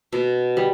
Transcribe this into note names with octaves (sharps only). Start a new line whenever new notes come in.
B2
G3